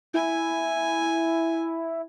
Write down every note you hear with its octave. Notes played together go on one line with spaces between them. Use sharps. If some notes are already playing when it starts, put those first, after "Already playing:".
E4 G#5